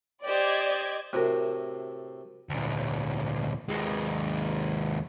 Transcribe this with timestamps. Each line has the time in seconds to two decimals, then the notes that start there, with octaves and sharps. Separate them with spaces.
0.24 G4 C5 D5 D#5 G#6
1.13 A2 C3 F#4 A#4
2.49 D2 A#2
3.69 D#2 G#3